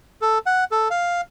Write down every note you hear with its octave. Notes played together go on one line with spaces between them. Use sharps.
A4
F#5
A4
F5